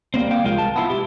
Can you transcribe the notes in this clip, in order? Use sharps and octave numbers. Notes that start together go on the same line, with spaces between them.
G3 A#3 C4
F5 G5
C2 G#3 F4 A#4
A5
B3 E4 F4
G4